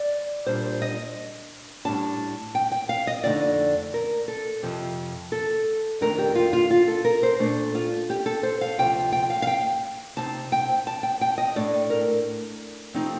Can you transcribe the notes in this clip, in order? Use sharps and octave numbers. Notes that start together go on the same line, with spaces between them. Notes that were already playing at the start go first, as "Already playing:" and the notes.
Already playing: D5
A#2 G3 D4 C5
D#5
A2 G3 D4 A5
G5
G5
F5
D#5
F2 D3 A3 D#4 D5
A#4
A4
F2 C3 F3
A4
F2 D#3 A3 D4 A#4
G4
F4
F4
F4
A4
A#4
C5
A#2 A3 D4
F4
G4
A4
C5
F5
D2 C3 F3 G5
G5
F5
F5
G5
C3 F3 C4 D#4 A5
G5
A5
G5
G5
D#5
A2 A3 D4 D5
A#4
C3 F3 A3 C4 D#4